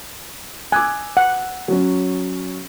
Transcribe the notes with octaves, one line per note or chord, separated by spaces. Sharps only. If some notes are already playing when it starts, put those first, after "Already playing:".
G#5 D6 E6 F#6
F#5
F#3 C#4